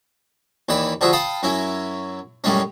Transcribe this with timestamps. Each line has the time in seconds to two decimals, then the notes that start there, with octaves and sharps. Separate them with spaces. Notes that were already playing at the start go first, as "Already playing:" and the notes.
0.69 D#2 D#3 E3 D5 B5
1.01 D3 F3 F#4 G#4 E5
1.13 F5 G5 A5 B5 D#6
1.43 F#2 F#3 C#4 E4
2.44 F#2 A2 G3 G#3 C#4